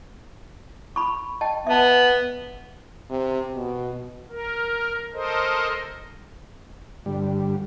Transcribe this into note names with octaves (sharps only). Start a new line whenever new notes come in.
B5 C#6
D#5 G5 A5
B3 E5 A5
C3
B2
A#4
A4 A#4 C5 D#5
G2 D3 G3